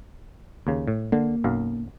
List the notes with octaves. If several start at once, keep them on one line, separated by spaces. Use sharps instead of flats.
D#2 C#3
A2
D3 A#3
B1 F#2 F5